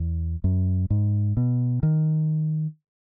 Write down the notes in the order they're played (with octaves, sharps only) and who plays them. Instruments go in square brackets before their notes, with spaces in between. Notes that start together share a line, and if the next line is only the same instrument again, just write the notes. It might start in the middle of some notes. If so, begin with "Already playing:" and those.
Already playing: [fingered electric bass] E2
F#2
G#2
B2
D#3